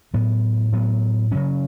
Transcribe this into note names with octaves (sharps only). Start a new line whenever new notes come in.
A2 F#3 B3
A2 F#3 B3
C#3 F#3 C#4